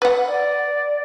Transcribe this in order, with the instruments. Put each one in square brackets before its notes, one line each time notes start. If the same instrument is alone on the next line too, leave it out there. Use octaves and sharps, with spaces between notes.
[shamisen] B4 F#5
[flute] D5